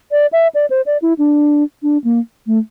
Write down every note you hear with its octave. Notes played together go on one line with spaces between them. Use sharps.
D5
E5
D5
C5
D5
E4
D4
D4
A#3
A3